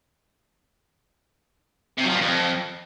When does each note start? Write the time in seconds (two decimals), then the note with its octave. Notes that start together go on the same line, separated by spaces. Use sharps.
1.98 C3
2.04 F#3
2.10 F3
2.15 G2
2.21 F2